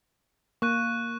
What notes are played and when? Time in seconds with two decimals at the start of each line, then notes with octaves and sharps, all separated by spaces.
0.62 A#3 C#6 F#6 D#7